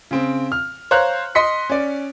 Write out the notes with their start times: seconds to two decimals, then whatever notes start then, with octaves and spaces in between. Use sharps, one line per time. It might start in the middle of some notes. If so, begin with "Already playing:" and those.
0.11 C#3 C4
0.52 F6
0.91 C5 C#5 F5 A#5 F#6
1.35 D#5 C6 B6 C#7
1.70 C#4 D5